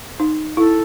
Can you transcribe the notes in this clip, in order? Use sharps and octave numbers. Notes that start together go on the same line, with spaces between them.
D#4
E4 A4